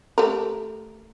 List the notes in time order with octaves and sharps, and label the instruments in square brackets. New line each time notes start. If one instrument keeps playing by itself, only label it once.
[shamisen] A3 G4 A#4